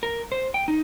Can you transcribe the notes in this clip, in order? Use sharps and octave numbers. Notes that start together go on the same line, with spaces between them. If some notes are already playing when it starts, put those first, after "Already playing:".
A#4
C5
G5
D#4